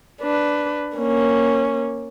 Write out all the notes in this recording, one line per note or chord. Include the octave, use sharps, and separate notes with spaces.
D4 B4
A#3 C#4